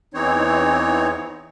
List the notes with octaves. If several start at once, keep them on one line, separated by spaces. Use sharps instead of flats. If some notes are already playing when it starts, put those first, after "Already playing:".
E2 E3 C4 D#4 C#5